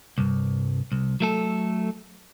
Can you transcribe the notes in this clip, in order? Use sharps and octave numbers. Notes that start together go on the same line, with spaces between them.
C2 G2
C2
F#3 A3 A4